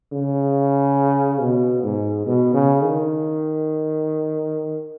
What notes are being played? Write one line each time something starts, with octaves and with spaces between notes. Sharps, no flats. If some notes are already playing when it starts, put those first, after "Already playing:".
C#3
B2
G#2
B2
C#3
D#3